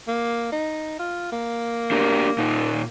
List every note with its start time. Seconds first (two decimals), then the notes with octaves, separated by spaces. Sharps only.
0.08 A#3
0.52 D#4
0.99 F4
1.32 A#3
1.92 D4 G4 A#4
2.38 A#2 D#4